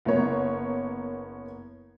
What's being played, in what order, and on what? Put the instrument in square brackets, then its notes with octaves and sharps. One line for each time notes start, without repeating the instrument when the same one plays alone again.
[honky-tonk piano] F#1 A#3 B3 C#5